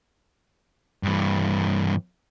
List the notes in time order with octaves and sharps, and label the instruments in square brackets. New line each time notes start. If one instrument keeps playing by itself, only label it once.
[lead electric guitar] G2 E3